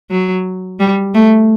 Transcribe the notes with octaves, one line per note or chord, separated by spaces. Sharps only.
F#3
G3
A3